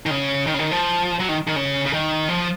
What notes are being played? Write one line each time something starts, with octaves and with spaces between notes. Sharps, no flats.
D#3
C#3
D#3
C#3
D#3
F3
F#3
D#3
D#3
C#3
C#3
D#3
F3